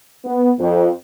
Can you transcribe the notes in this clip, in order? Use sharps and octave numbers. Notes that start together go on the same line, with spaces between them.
B3
F2